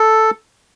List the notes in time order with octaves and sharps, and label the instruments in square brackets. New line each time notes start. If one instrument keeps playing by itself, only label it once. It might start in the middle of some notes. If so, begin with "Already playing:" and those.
Already playing: [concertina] A4